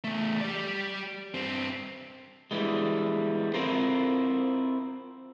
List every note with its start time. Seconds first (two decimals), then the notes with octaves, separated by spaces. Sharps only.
0.04 E2 A3
0.41 G4 D5
1.34 G2 C4
2.51 E3 G3 G#3
3.54 C4 E4 F4 A#4 C5